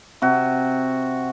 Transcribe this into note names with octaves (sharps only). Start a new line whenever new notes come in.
C3 F#4